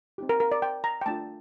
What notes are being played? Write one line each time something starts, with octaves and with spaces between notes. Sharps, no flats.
C4 D#4 G4
A#4
A#4
D5
G5
A#5
G5
A3 D4 F4 A5